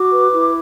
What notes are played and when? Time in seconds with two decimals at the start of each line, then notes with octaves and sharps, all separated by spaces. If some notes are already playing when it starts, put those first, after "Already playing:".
Already playing: F#4 D6
0.11 B4
0.33 E4